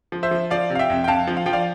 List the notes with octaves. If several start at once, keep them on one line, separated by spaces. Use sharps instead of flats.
F3
C5 E5
F3
F3 D5 F5
C3
F5
E5 G5
F2
G5
F2 F5 A5
F3
F5
F3 G5
D5 F5